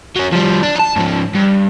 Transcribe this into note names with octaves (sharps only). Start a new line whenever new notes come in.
F#3 C#4
F3 G3
D4
A5 A#5
G#2 F3
G2